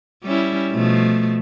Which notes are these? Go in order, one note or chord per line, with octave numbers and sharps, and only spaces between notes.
G3 C#4 E4
B2 F3 A3